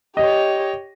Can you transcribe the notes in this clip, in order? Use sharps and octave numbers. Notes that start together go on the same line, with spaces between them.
G4 C#5 D#5